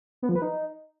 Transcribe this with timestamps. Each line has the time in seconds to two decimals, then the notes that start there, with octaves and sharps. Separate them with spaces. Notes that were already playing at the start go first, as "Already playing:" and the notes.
0.22 B3
0.29 F3
0.35 B4
0.42 D#4